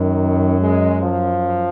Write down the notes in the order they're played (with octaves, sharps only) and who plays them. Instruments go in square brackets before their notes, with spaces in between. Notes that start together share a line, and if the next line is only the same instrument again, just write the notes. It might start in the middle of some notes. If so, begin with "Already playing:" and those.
Already playing: [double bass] F#2 [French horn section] D#3
[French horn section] G#3
F3